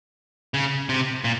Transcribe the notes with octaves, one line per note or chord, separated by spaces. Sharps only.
C#3
C3
A#2